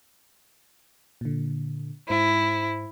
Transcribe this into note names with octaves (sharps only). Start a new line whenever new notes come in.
A#2 D3
G#2 E4 C5